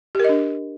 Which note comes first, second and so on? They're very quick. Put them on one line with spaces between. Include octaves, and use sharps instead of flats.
G4 A#4 D#5 D4